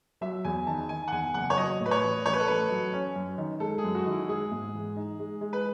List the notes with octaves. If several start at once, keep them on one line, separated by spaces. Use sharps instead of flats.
F#3 E5
E2 G#5
D#3 A5
D#3 G#5
F#5
E2 G#5
F#1 F#5
C#5
F#3 D#5
A2
B4
C#5
A1
A1 C#5
B4
A4
A1 B4
F#3
C#4
F#2
D#3
G#3 A4
G#4
F#2
F#4
D#3
E4
G#3 G#4
G#2
E3
D#4
G#3
G#3
B4